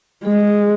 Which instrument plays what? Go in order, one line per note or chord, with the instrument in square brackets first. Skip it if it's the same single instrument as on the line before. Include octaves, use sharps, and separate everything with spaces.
[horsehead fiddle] G#3 [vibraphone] G#4